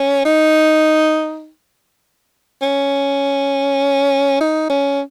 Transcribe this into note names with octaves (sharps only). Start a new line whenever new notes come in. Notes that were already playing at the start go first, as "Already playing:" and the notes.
Already playing: C#4
D#4
C#4
D#4
C#4